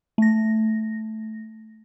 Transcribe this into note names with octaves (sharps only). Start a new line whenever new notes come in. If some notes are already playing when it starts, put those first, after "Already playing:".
A3 A#6